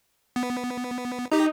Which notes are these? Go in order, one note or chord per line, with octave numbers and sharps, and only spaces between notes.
B3
D#4 G4 A#5